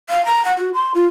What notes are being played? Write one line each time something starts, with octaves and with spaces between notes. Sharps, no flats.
F5
A#5
F#5
F#4
C6
F4